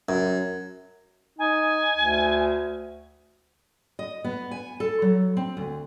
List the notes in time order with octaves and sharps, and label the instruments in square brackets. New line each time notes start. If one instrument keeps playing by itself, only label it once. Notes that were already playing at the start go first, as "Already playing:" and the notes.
[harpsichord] F#2
[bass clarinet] D#4 [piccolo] G#5
[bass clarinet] D2
[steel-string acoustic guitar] D#5
B3
G#5
A4
F#3
C4
D2